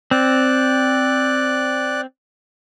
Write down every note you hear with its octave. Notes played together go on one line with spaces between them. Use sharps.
C4 D5 F#6